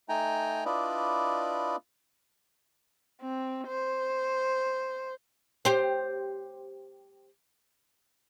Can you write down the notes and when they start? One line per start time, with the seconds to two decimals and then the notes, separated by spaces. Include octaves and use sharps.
0.09 A3 D#4 G5 G#5 A#5
0.65 D4 E4 F4 B4 D5 D#5
3.22 C4
3.68 C5
5.65 G4 C5